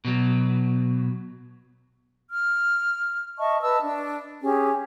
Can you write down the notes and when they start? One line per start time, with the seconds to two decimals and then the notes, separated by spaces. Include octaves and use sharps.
0.05 B2 F#3
2.30 F6
3.39 D#5 E5 A5 C#6
3.62 B4 D#5 A5 E6
3.81 D4
4.41 C#4 G4 G#4